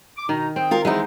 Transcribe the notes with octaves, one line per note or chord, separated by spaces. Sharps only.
D6
B2 D#3 D#4 A#5
C4 G#4 G5
F4 A#4
E3 G#3 B3 D#4 G#4 C5